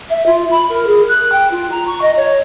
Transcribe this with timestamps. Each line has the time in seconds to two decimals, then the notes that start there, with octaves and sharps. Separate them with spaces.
0.10 E5
0.26 F4
0.51 B5
0.69 A#4
0.87 G#4
1.08 F#6
1.32 G5
1.51 F4
1.71 A#5
1.87 C#6
2.01 D#5
2.17 C#5